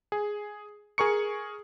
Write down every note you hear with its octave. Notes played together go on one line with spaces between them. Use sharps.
G#4
G#4 A#4 C#6 C#7